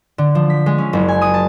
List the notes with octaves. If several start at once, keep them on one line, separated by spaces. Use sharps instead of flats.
D3
F3
B6
G#3
C#4
F#1
G#5
D#6
A5